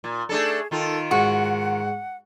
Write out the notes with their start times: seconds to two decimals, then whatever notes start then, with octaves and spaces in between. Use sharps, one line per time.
0.04 A#2
0.29 A3 D4 G#4 A4
0.71 D#3 F4 A4
1.11 G#2 F#4 F#5